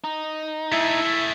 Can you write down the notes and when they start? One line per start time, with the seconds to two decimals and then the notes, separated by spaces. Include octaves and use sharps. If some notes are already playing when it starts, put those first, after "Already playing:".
0.04 D#4
0.72 A3 E4 G#4 E5